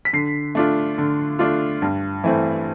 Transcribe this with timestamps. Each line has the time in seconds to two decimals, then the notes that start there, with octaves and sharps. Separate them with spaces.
0.05 B6
0.13 D3 C7
0.55 A3 D4 F4
0.98 D3
1.39 A3 D4 F4
1.82 G2
2.24 E3 A3 C4